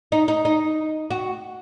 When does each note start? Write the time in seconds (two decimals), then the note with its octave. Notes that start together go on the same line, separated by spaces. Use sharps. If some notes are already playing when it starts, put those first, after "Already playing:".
0.12 D#4
0.28 D#4
0.45 D#4
1.10 F#4